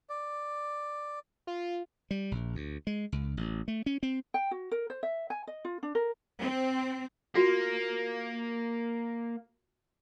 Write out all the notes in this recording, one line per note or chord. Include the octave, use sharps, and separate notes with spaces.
D5
F4
G3
A#1
D2
G#3
C#2
A1
A3
C#4
C4
G5
F#4
A#4
C5
E5
G#5
D#5
F4
D4
A#4
C4
A#3 F4 F#4